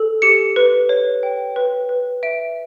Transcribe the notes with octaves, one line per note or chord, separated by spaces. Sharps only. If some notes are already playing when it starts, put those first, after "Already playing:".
Already playing: A4
G4 C#7
B4
C#5
G5
B4
B4
E5 D7